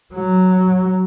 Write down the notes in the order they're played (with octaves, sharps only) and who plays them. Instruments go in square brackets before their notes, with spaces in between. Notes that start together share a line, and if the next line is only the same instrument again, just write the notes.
[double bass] F#3